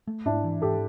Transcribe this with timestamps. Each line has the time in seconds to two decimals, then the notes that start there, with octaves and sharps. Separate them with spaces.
0.07 A3
0.26 G#2 D4 E4
0.44 E3
0.62 G#2 G4 A4